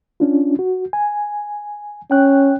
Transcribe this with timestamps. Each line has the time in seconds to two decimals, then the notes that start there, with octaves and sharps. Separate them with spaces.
0.20 C#4 D4 F4
0.59 F#4
0.93 G#5
2.11 C#4 G5 F#6